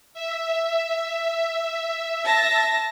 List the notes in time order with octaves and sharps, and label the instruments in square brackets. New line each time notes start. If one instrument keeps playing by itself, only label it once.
[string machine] E5
[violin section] A5 A#6